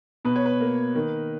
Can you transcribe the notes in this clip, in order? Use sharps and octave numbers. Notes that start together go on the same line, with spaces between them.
B2 B4
C#5
B4
A#3
D#3